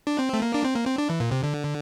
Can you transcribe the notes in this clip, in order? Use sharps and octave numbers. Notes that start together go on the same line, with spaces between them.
D4
C4
A3
A#3
D4
C4
A#3
C4
D4
E3
A#2
C3
D3